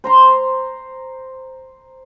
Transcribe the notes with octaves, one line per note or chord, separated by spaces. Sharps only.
C5 A#5 C6